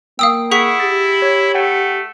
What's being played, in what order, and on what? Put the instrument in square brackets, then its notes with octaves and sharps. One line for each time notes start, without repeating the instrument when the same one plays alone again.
[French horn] A#3 [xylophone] F5 D#6 E6 [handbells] G5
[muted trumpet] E4 [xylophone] G#4 C#6 B6 [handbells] F#5 D#6
[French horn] G4 [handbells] A6
[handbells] C#5
[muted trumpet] A3 [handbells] F#5 G5